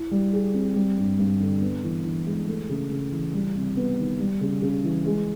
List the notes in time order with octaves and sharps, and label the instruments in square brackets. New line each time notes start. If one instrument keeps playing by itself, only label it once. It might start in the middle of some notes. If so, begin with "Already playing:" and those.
Already playing: [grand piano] E4
G3
G#4
C4
G3
G2
G2
D3
B3
E3
E3
G#3
A3
C#3
C#3
E3
G3
C3
B3
D#3
G3
C#3
C#3
E3
G#3